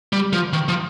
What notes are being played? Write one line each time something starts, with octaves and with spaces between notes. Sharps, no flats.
G3
F3
D#3
F3